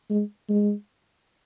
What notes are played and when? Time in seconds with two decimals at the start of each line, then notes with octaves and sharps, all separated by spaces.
0.10 G#3
0.49 G#3